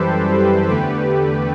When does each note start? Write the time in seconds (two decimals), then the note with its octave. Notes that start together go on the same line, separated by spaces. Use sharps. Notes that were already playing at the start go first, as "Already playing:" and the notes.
Already playing: F#2 E3 G3 G4 A4 B4 C5
0.38 G4 B4
0.69 E2 D3 A3 G4 B4